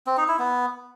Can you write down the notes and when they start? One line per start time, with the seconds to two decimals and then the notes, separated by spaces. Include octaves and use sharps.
0.07 C4
0.17 D#4
0.28 E4
0.39 B3